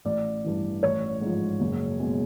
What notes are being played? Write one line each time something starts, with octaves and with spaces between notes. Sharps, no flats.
A1 D5
G2 E3
A1 C#5
G#2 F3
F#1
B2 G#3